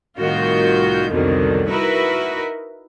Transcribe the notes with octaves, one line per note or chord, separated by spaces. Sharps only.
C2 A2 D#3 F4 F#4 G6
C2 F2 B2 D3 D#3 F#3
D#4 E4 F#4 A#4 B4 E5